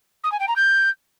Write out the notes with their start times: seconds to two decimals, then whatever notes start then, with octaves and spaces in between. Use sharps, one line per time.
0.23 D#6
0.32 G#5
0.40 G5
0.48 A#5
0.56 G6